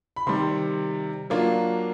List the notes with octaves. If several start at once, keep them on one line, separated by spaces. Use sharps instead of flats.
B5
C3 D#3 G3 C6
F#3 A#3 D4 F4